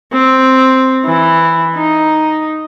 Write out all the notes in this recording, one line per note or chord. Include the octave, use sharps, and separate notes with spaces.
C4
E3
D#4